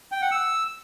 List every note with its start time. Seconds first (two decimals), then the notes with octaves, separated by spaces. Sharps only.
0.12 G5
0.22 F#5
0.32 E6